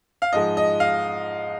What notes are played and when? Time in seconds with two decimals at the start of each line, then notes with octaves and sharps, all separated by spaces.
0.22 F5
0.33 G#2 F3 G#3 D#5
0.57 D#5
0.80 F5